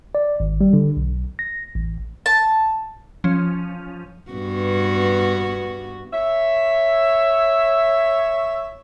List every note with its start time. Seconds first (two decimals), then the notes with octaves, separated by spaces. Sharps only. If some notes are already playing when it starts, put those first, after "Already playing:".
0.15 D5
0.40 G#1
0.61 G3
0.73 D3
0.97 B1
1.39 A#6
1.75 A1
2.26 A5
3.24 F3 C#4
4.31 G2 B3 F#4
6.13 C#5 E5